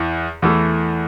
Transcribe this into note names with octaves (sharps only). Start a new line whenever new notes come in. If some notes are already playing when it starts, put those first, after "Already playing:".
Already playing: E2 E3
E2 E3 A3